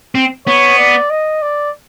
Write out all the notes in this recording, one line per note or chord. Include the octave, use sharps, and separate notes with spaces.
C4
B3 C#5
D5
D#5
D5